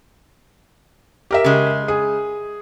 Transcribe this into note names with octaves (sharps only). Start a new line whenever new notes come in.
G4 A#4 E5
C#3 G#3
G#4